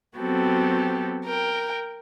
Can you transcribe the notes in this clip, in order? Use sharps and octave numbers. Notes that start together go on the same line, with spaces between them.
F#3 B3 C4 F#4 G4 A4
A#4 G5